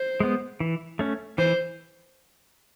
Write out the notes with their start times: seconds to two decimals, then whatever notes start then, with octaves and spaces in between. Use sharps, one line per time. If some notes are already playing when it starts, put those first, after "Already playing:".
Already playing: C5
0.20 G#3 B3
0.60 E3
0.99 A3 C#4
1.38 E3 C5